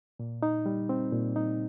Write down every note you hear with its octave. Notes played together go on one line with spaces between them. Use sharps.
A#2
D#4
G3
C4
A#2
D#4